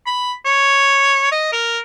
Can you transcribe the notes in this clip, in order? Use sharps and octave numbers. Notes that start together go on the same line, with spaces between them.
B5
C#5
D#5
A#4